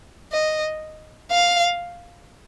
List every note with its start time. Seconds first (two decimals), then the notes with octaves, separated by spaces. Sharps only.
0.32 D#5
1.31 F5